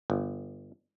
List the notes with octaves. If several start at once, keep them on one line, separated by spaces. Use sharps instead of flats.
G1